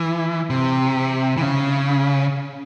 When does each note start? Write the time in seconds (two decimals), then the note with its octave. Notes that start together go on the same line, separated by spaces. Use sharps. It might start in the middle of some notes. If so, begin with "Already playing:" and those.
Already playing: E3
0.50 C3
1.37 E3
1.42 C#3